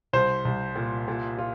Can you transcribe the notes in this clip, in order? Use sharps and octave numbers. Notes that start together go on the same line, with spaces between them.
C2 C5
C2
A#2
A#2
F4